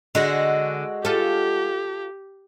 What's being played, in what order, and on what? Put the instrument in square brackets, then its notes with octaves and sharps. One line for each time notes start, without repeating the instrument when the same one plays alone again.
[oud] D3 [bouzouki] G#3 F#4
[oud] F4 A4 [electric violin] G4